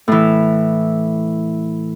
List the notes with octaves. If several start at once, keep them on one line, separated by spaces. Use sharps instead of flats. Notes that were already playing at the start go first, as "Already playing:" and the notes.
A2 E3